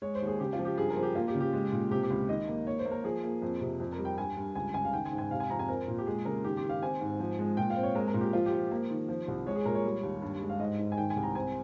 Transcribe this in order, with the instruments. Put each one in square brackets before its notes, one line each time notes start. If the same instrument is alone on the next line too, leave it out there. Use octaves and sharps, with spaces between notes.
[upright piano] G#3 C#5
C5
D#2
G#4
C#3 G4
F4
F3
G4
G2 G#4
A#4
F3
G4
A#3 F4
G4
C#3
G4
G#3
A#2
C3 G4
G4
C#2
D#3 D#5
A#3
A#3 C#5
C5
A#3
A#4
F3 G#4
A#3
F2
C3
F2
A#4
G3
G5
G2 G#5
G2
C#2 G#5
C#3 G#5
F5
D#3 G5
G#5
G#2
G#5
C3 F5
G#5
F2 A#5
G#5
C4 A#4
A#2
G4
G#3 G#4
C#3 A#4
D#3 G4
G4
D#3
F5
C4 G#5
G#2
F3
G#3
A#2 G5
F5
C4
C#5
G#3 A#4
A#4
A#2
G4
F3 F4
G4
F3
A#3
D#3
F3
C2
G#3 C#5
G#4
A#2 A#4
C#5
G3
D#2
G2
G#3
F5
G#2 D#5
G#2
G#5
D#3 G5
G#5
C2
A#5
C4 G#5